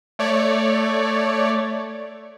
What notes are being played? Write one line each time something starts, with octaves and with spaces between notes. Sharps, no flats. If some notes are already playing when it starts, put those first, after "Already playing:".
A3 C#5 D5